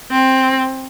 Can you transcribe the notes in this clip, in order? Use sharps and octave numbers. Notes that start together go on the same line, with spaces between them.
C4